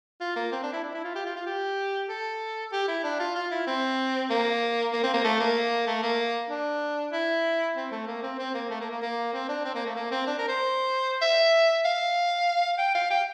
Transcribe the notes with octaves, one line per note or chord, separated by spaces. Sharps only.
F4
A#3
C4
D4
E4
D4
E4
F4
G4
F4
F4
G4
A4
G4
E4
D4
F4
F4
E4
C4
A#3
A#3
C4
A#3
A3
A#3
A3
A#3
D4
E4
C4
A3
A#3
C4
C4
A#3
A3
A#3
A#3
A#3
C4
D4
C4
A#3
A3
A#3
C4
D4
A#4
C5
E5
F5
G5
F5
G5